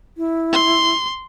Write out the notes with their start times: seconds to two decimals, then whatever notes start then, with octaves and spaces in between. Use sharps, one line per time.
0.17 E4
0.53 C6